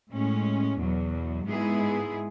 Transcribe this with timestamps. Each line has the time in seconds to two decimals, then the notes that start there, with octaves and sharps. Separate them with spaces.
0.10 A2 G#3 C#4
0.78 E2 B2 F#3
1.46 G#2 G#3 B3 E4 G#4